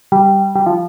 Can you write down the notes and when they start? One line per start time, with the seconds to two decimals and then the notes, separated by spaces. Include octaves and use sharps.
0.12 G3
0.56 G3
0.66 F3